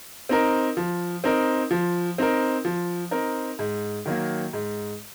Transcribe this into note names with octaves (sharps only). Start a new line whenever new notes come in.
C4 D#4 A#4
F3
C4 D#4 A#4
F3
C4 D#4 A#4
F3
C4 D#4 A#4
G#2
D#3 F#3 A#3
G#2